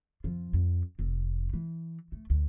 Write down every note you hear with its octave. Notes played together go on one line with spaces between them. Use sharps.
F2 F3
F2
F1 C4
E3
A3
D2